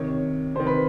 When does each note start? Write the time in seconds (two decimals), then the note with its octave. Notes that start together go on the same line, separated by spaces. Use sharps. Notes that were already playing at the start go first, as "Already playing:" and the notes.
Already playing: C3 D#3 C#5
0.55 C3 C5
0.60 D#3
0.67 B4